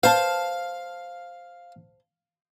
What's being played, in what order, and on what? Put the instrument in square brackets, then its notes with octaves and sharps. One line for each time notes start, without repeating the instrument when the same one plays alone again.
[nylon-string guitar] C5 A5 [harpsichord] F5